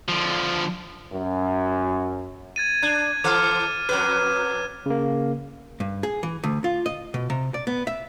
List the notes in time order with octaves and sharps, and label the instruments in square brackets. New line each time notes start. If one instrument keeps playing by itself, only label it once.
[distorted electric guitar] D3 F3
[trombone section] F#2
[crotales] G#6 A6 D#7
[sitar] D4
[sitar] E3 A4 [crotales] D6 F6
[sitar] F2 F#3 B4 [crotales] D#7
[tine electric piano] C#3 A#3
[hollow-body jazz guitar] G2
G#4
E3
D2
F4
D#5
B2
C3
D5
B3
E5